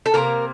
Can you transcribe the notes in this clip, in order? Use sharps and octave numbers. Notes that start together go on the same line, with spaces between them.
A4
C3 G3 A#3 A#4